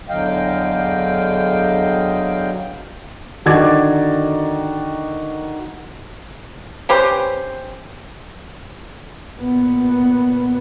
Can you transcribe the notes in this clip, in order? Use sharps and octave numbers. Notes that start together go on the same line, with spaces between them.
E2 D3 F#3 D#5 F5 G5
D3 D#3 F#4 D6 G#6 A6
C#4 G4 B4 C5
A#2 B3